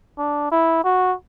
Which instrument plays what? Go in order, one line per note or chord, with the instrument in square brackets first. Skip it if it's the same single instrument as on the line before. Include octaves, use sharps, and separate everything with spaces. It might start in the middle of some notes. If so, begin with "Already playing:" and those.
[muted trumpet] D4
E4
F#4